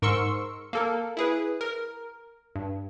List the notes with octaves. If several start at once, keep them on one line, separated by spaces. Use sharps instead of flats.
G#2 A#4 C6 C#6 E6 C#7
A#3 A4 A#4
E4 G#4 B4
A#4
G2